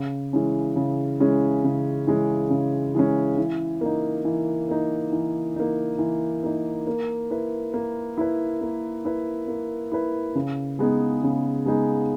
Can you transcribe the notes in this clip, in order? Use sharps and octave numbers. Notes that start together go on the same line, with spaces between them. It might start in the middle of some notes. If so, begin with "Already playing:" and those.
Already playing: C#3
E3 G#3 C#4
C#3
E3 G#3 C#4
C#3
E3 G#3 C#4
C#3
E3 G#3 C#4
E3
A#3 D#4
E3
A#3 D#4
E3
A#3 D#4
E3
A#3 D#4
A#3
E4 B4
A#3
E4 B4
A#3
E4 B4
A#3
E4 B4
C#3
G#3 B3 D#4 G#4
C#3
G#3 B3 D#4 G#4